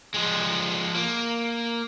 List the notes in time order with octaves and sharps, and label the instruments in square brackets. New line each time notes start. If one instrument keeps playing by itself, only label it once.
[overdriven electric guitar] F3 G#3
A#3